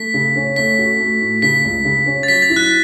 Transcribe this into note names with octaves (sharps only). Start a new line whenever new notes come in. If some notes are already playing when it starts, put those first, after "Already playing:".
Already playing: A3 B6
C#3
C#4
A3 B6
F#4
A3
A2
C#3 B6
C#2
C#3
C#4
A6
F#3 B6
A6
E4
F#6